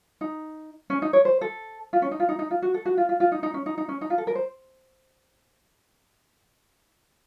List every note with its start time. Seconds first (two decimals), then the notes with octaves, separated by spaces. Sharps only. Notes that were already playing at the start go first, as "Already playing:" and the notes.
0.21 D#4
0.90 C#4
1.02 D#4
1.13 C#5
1.25 C5
1.41 A4
1.93 F4
2.02 C#4
2.11 D#4
2.20 F4
2.29 D#4
2.39 D#4
2.51 F4
2.62 F#4
2.74 A4
2.85 F#4
2.97 F4
3.09 F4
3.20 F4
3.32 D#4
3.43 D#4
3.54 C#4
3.66 D#4
3.78 D#4
3.89 C#4
4.01 D#4
4.10 F4
4.18 A4
4.27 A#4
4.35 C5